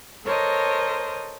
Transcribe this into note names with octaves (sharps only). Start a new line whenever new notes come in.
A4 A#4 C5 C#5 D#5